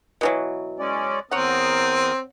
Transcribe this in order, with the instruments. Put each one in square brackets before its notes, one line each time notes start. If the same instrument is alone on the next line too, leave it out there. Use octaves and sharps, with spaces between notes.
[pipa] B2 E3 F#3
[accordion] G#3 C#4 D5
[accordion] E2 A#4 D#6 [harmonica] C4 [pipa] C#5 F#5